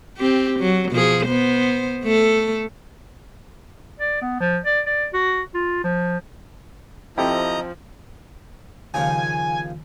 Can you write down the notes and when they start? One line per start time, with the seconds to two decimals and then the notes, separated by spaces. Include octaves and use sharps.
0.17 C4 G4
0.59 F#3
0.92 B2 F3 G#4
1.26 B3 C5
2.04 A3 A4
4.00 D5
4.22 B3
4.40 F3
4.65 D5
4.86 D5
5.14 F#4
5.54 F4
5.84 F3
7.18 F3 C4 E4 G4 A4 D#5 A#5
8.94 D#2 C#3 F3 G#5